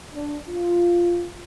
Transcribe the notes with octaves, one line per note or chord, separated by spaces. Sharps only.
D4
F4